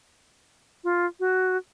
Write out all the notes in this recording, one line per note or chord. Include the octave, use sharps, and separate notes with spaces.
F4
F#4